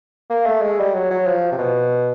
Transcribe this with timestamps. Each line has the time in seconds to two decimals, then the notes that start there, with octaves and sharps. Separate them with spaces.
0.30 A#3
0.46 A3
0.62 G#3
0.79 G3
0.94 F#3
1.11 F#3
1.26 F3
1.52 C3
1.58 B2